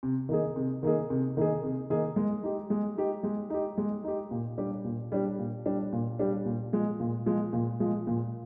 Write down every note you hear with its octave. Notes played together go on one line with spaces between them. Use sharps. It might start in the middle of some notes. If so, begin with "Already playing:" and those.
C3
D#3 A#3 D#4 G#4
C3
D#3 A#3 D#4 G#4
C3
D#3 A#3 D#4 G#4
C3
D#3 A#3 D#4 G#4
G#3
D#4 G4
G#3
D#4 G4
G#3
D#4 G4
G#3
D#4 G4
A#2
G3 D4 G4
A#2
G3 D4 G4
A#2
G3 D4 G4
A#2
G3 D4 G4
A#2
F3 G#3
A#2
F3 G#3
A#2
F3 G#3
A#2